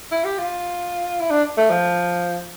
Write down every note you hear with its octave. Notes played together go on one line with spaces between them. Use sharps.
E4
G4
F4
E4
D4
A3
F3